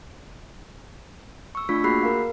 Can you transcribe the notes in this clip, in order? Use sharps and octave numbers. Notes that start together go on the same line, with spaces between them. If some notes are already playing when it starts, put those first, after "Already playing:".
C#6 E6
A3 D4 F4 C#6 B6
A#3 F#4 G#4 B5 F#6 C7
A#4 F5